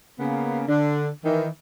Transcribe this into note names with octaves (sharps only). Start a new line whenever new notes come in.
C#3 A#3 B3
D3 D4
D#3 E3